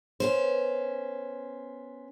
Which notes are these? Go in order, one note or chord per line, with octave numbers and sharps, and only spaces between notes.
B3 C#4 C5